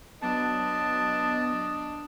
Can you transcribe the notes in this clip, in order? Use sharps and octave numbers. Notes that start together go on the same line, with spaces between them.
F#3 B3 D4 D#5 A5